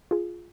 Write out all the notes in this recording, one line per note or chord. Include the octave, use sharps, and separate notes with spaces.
F4 G#4